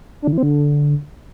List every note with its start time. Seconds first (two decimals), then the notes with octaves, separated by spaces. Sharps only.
0.22 D4
0.27 D3
0.33 E3
0.38 C4
0.43 D3